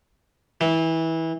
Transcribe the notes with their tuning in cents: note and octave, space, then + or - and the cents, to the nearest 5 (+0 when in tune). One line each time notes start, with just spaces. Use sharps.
E3 -20